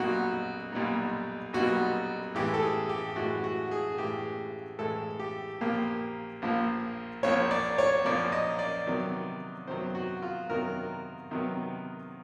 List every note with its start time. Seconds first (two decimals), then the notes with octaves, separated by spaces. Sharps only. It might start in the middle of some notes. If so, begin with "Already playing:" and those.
Already playing: B1 A#2 G3 B3 D#4 F#4
0.72 B1 A#2 G3 B3 D#4
1.53 B1 A#2 G3 B3 D#4 F#4
2.35 A2 E3 G#3 G4
2.54 A4
2.62 G#4
2.89 G4
3.16 A2 E3 G#3 F#4
3.44 F#4
3.71 G#4
3.98 A2 E3 G#3 G4
4.79 A2 E3 G#3 A4
5.19 G4
5.61 A#1 A#2 F3 A#3 G4
6.42 A#1 A#2 F3 A#3
7.23 A#1 A#2 F3 A#3 C#5
7.51 D5
7.78 C#5
8.05 A#1 A#2 F3 A#3 D5
8.32 D#5
8.59 D5
8.87 C3 D#3 F#3 B3
9.67 C3 D#3 F#3 B3 C5
9.95 F#4
10.22 F4
10.49 C3 D#3 F#3 B3 A#4
11.31 C3 D#3 F#3 B3